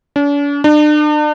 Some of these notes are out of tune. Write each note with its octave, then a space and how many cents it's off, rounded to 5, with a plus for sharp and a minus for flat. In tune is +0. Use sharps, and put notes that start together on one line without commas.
D4 -45
D4 +40